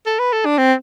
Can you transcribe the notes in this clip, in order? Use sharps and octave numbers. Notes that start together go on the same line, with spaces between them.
A4
B4
A4
D4
C4